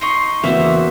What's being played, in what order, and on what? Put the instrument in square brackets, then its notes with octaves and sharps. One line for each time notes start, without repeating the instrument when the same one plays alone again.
[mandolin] D#4 D#5 C#6 [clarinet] C6
[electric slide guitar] E2 C#3 E3 [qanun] A#3 C4 F#4 [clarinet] E5